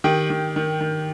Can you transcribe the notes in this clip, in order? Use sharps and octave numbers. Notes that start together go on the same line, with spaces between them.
D#3 G4 G5
D#3
D#3
D#3